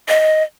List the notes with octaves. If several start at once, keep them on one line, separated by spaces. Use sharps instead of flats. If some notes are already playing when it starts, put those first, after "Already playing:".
D#5